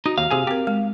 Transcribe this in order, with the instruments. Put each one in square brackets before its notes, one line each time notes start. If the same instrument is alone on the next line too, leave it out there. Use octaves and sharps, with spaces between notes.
[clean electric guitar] D#4 [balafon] F#4
[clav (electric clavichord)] D#2 [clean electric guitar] F5
[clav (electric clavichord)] C3 G#4 G#5
[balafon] C4 A#4 [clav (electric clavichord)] G4
[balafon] G#3